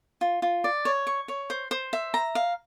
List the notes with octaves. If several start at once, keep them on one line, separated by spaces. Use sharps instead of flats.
F4
F4
D5
C#5
C#6
C#5
C5
C5
E5
A#5
F5